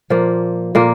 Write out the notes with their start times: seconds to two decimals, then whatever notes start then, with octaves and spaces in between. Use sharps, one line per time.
0.10 A#2 F3 A#3
0.75 A#2 A#3